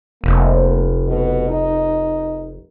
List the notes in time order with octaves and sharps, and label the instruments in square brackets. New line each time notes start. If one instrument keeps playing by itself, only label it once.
[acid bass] F1 [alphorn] A#3
[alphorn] B2
D#4